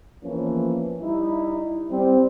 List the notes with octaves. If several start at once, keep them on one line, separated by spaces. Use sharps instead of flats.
E2 E3 F3 A#3 C#4
G3 D#4 E4
G3 C4